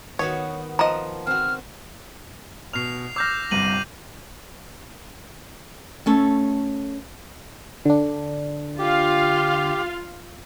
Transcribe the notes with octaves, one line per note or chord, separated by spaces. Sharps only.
D#3 B3 F#4 C#5
F3 D#5 F#5 A#5
C4 F#4 F6
B2 F6 C7 F7
D6 E6 F6 G6 A#6
G1 C2 G2 D#7 F#7
A3 C#4 A4
D3 D4
F4 G4 F5